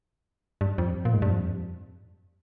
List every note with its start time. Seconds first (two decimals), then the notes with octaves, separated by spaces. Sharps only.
0.61 G2
0.78 F2
1.05 A#2
1.14 G#2
1.22 G2
1.30 F2